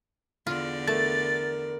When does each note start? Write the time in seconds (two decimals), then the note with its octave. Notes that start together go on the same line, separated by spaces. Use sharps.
0.47 E2 D3 F4 D5
0.87 A3 A#4 A6